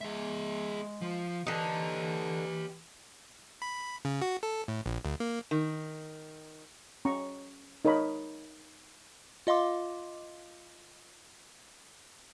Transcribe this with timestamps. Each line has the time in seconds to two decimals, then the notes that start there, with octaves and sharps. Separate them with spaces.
0.01 G#3 G#4 E5
1.02 F3
1.47 D3 E3 D#4 G4 D#5
3.62 B5
4.05 C#3
4.22 F#4
4.43 A4
4.68 A2
4.86 A#1
5.05 D2
5.20 A#3
5.51 D#3
7.05 C#4 A#5 C#6
7.85 D#4 A#4 C#5 D#5 B5
9.47 F4 D#5 F5 C6 D6